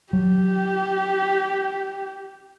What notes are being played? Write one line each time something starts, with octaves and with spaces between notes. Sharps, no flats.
F#3 G4